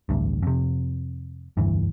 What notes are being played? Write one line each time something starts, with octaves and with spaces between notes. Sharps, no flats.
A1 D2 G2
F2 C3
F1 D2 G2 E3